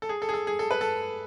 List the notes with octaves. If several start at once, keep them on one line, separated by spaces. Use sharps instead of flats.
A4
G#4
A4
G#4
A4
G#4
A4
B4
A4